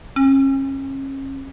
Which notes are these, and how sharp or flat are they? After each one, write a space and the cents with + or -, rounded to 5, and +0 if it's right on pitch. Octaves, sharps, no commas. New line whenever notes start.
C#4 -35